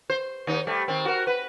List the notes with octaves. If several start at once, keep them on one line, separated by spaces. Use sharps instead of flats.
C5
D#2 D#4
G3 A3
D#3 C4
F#4 A#4
B4